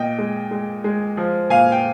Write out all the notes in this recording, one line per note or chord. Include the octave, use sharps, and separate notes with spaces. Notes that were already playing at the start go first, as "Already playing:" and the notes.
Already playing: A#2 D#5 G5
G#3
G#3
G#3
F3
A#2 F5 G#5
G5